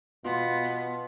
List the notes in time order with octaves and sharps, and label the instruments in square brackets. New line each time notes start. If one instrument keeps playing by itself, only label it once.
[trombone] B2 [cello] B3 [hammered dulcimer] F4 C6